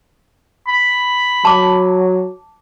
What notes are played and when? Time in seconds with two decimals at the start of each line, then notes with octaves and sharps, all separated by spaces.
0.68 B5
1.45 F#3 A5 D6